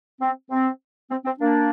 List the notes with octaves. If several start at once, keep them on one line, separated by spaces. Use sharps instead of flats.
C4
C4
C4
C4
A#3 D4